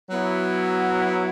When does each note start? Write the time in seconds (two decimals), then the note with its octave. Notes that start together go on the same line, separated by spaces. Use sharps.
0.10 F#3 B3 E4